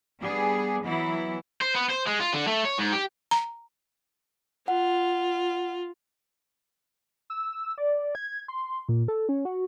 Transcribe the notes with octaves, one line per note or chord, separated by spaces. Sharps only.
G3 B3 D4 G#4
E3 F#3 B3 E4
C5
B3
C5
G#3
F4
D3
A3
C#5
G#2
G4
A#5
F4 F#5
E6
D5
G#6
C6
A#2
A4
C#4
F#4